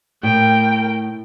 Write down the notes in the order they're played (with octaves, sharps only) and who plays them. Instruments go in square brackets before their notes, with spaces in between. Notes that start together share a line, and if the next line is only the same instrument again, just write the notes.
[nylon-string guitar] A2 [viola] A#4 G5